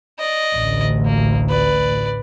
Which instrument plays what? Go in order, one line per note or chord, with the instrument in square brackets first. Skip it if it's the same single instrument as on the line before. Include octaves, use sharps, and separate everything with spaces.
[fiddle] D5 D#5
[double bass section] A1 D2
[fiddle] A#3
B4 D5